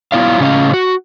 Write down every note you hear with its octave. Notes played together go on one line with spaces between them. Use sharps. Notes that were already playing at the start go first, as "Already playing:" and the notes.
F#3 B3 E4 F4 D5 F5
A2 C#3 C#4 D#5 F5
F#4